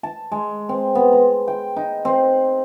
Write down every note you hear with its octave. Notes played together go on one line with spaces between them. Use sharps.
A5
G#3
C4
B3
A#5
G5
D#4
C4